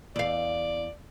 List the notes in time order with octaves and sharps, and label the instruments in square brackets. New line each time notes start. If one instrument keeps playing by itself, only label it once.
[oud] E2 F5 [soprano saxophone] D5